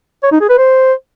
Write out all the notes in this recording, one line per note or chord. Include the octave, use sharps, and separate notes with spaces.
C#5
D#4
G#4
B4
C5